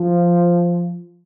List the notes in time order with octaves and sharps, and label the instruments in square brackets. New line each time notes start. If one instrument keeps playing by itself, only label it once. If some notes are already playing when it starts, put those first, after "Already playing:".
Already playing: [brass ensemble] F3